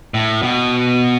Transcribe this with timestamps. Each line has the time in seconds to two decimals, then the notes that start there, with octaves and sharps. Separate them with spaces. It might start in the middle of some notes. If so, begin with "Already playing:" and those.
0.14 A2
0.42 B2